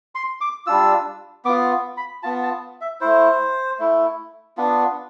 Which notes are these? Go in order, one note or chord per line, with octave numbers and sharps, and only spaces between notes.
C6
D6
G3 D4 F4 E6
B3 F4 D6
B5
B3 F4 A5
A5
E5
A3 E4 C5
A3 E4
B3 D4 F4